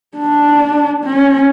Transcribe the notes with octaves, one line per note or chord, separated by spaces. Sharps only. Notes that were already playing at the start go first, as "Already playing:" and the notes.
D4
C#4